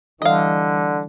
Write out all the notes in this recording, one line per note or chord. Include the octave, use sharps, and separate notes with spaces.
D3 E3 G3 D#5 F5